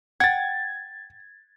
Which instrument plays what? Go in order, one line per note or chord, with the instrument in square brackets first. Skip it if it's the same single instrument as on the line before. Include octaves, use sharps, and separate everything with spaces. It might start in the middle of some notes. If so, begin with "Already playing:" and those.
[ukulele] F#5 G5 [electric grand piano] G#6 A6